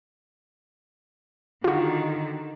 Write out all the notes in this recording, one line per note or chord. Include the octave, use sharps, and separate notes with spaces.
D3 D#3 F4 F#4